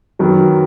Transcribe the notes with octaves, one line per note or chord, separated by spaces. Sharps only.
F#2 D#3 F#3 B3